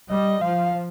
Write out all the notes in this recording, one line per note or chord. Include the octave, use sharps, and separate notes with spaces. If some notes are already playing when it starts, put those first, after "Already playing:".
G3 D#5
F3 F5